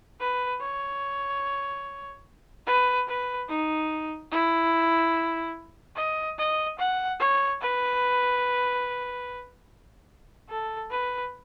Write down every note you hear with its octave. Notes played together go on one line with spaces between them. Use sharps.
B4
C#5
B4
B4
D#4
E4
D#5
D#5
F#5
C#5
B4
A4
B4